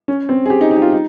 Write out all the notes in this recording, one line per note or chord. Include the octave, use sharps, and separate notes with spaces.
C#4
C4
G#4
G4
D#4
D#4
G4
F4
D#4